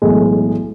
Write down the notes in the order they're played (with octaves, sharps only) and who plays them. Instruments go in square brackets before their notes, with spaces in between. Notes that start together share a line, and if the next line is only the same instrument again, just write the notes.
[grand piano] B1 A2 E3 G#3